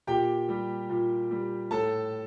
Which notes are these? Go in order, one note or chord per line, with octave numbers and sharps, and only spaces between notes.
A#2 G4 G5
G3
A#2
G3
A2 A4 A5